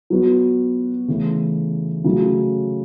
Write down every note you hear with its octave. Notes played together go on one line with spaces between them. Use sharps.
F#3 B3 F#4 B4
C#3 E3 A3
C#3 F#3 A3